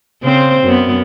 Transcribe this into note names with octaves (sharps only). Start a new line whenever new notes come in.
C#3 C4 C5
F#2 B3